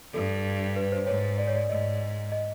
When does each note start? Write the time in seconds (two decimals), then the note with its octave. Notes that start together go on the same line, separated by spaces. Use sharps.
0.13 G2 A4
0.76 B4
0.92 C5
1.07 G#2 C#5
1.38 D5
1.47 C#5
1.56 D5
1.69 G#2 D#5
2.32 D#5